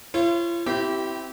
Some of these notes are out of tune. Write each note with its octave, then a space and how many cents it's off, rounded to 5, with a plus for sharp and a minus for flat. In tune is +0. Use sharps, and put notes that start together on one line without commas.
F4 -45 C#5 -40
C4 +0 E4 +0 G4 -25